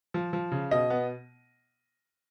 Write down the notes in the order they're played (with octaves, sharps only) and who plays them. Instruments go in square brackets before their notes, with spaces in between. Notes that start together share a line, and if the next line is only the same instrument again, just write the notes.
[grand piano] F3
F3
C#3
[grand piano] B2 [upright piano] D#5
[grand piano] B3